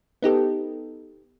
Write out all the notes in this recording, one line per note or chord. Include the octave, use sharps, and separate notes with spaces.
B3 D#4 G4 A4